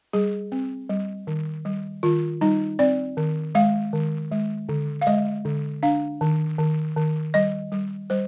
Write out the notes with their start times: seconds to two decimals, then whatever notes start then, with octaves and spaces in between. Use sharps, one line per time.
0.13 G3 G#4
0.52 C4
0.89 G3
1.27 D#3
1.65 G3
2.03 D#3 F4
2.41 G3 D#4
2.79 C4 D5
3.17 D#3
3.55 G#3 F5
3.93 D#3
4.31 G#3
4.69 D3
5.01 F5
5.07 G#3 D#5
5.45 D3
5.83 D4 F5
6.21 D#3
6.59 D#3
6.97 D#3
7.34 G3 D#5
7.72 G3
8.10 G3 C5